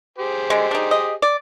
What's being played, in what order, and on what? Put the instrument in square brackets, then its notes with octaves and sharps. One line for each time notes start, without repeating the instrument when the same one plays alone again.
[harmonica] G4 G#4 C5
[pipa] D3 G#3
D4 D#4
D#5
D5